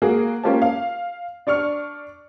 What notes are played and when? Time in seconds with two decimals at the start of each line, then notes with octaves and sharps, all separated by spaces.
0.02 A#3 F#4 G#4
0.43 A#3 C#4 F4 G4 C5 A5
0.62 F5
1.47 D4 D5 C#6 F6